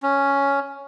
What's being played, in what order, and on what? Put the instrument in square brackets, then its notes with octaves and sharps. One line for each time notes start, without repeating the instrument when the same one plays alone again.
[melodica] C#4